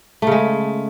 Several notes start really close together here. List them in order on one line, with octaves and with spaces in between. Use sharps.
A3 C#3 G#3